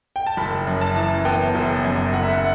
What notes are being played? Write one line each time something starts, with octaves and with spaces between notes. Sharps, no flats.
G5
A5
F#1 B5
F#2
A5
E3
B3 G5
F#1
F#2
F#1 F#5
E5
F#5